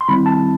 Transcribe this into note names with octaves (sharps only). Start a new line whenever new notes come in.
C6
D#3 G3 C4 E4 B5
A5